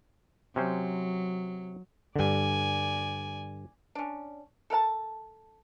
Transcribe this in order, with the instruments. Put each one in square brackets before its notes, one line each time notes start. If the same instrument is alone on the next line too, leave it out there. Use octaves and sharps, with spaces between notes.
[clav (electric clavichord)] C3 C#4 C5 [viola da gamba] F#3
[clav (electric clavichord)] G2 D3 [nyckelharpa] D5 G#5
[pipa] C#4 D4
A4 A#4 F5 A5